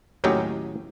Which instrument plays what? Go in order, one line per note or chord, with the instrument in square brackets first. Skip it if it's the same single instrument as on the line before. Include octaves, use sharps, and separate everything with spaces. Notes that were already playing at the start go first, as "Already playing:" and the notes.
[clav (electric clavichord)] D#2 A2 F#3 C#4 D#4 G4